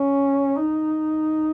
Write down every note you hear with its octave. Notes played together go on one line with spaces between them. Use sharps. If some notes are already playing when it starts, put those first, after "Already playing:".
Already playing: C#4
D#4